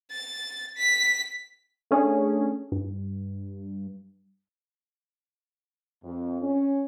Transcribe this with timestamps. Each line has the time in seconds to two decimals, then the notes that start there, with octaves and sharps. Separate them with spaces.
0.11 A6
0.77 B6
1.91 A3 C#4 D4 G#4
2.72 G2
6.04 F2
6.42 C#4